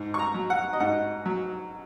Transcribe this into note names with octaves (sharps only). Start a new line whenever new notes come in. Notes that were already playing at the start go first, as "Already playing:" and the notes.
Already playing: G#2
C#6
A#5
F#3
F#5
D#5
G#2 F#5
F#3